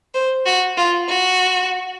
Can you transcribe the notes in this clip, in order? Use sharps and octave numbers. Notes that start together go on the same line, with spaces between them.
C5
F#4
F4
F#4